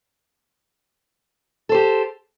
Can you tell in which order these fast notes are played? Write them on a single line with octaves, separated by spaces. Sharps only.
A4 C5 G4